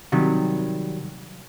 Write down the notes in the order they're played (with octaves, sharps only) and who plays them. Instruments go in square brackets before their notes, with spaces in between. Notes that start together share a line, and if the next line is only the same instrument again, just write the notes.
[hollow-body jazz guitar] C3 D#3 F#3 G3